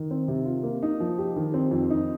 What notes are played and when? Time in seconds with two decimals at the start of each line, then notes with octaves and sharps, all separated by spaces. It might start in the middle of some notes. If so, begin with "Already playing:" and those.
Already playing: D#3
0.11 C4
0.28 C3
0.45 F4
0.63 A#3
0.83 D#4
1.00 F3
1.18 G4
1.36 D#3
1.54 C4
1.71 F2
1.90 D#4